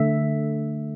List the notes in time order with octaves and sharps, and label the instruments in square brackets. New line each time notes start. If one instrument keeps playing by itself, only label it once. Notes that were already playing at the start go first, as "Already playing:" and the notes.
Already playing: [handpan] D3 A3 E5